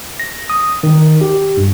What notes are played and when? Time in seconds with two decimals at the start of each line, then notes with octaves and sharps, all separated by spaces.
0.20 A#6
0.50 D#6
0.83 D#3
1.21 G4
1.57 G2